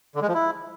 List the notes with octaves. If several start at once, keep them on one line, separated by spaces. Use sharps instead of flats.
D3
G#3
F3
E4